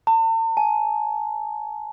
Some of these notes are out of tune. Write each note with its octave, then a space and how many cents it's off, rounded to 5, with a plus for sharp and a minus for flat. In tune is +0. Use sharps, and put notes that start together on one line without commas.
A5 +40
G#5 +35